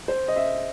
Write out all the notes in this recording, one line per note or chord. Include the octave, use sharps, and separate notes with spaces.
C5
D#5
E5